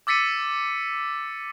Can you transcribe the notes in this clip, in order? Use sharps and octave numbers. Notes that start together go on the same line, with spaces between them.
D6 E6 A6 B6 C#7 D#7